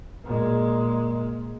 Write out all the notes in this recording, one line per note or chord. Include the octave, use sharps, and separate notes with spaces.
A#2 G#3